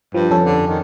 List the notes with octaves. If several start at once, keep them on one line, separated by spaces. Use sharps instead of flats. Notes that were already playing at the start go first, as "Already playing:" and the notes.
G2 F3
F2 C#4 A4
D3
D#3